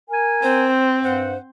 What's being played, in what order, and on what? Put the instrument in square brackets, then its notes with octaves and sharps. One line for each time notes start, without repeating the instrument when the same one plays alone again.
[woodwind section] A#4 G#5
[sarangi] C4 [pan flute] C5
[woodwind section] G2 F#5 [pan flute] C5